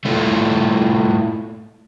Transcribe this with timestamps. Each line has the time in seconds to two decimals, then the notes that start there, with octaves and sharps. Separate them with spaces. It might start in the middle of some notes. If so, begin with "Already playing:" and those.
0.05 A3 E4 F4 A4 C#5